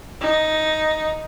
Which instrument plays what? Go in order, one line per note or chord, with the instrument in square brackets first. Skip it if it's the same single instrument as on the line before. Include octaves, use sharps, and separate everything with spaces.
[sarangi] D#4